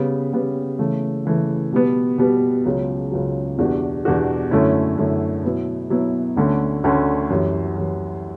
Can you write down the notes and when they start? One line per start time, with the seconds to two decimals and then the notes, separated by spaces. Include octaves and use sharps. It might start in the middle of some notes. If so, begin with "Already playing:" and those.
Already playing: C#3 G3 B3
0.33 C#3 G3 B3
0.79 C#3 E3 A3
1.25 C#3 E3 A3
1.72 B2 G3 B3
2.18 B2 G3 B3
2.65 C#2 C#3 F#3
3.12 C#2 C#3 F#3
3.58 E2 B2 G3 D4 F#4
4.05 E2 B2 G3 D4 F#4
4.51 F#2 D3 A3 C#4 E4
4.98 F#2 D3 A3 C#4 E4
5.44 B2 F#3 B3 E4
5.90 B2 F#3 B3 E4
6.37 D2 D3 A3 C#4
6.83 D2 D3 A3 C#4
7.30 F#2 E3 G3
7.77 F#2 E3 G3